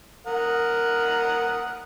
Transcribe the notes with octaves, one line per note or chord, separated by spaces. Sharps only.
A#4 F#5 D#6